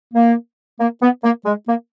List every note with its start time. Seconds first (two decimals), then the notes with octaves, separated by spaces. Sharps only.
0.14 A#3
0.80 A#3
1.02 B3
1.24 A#3
1.46 G#3
1.68 A#3